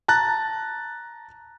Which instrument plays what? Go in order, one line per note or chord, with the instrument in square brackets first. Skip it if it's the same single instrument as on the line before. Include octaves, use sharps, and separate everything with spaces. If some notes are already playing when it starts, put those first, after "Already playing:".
[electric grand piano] A5 A#5 F#6 A6